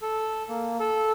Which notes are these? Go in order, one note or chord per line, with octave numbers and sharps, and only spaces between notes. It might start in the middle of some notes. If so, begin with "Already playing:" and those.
A4
A#3
A4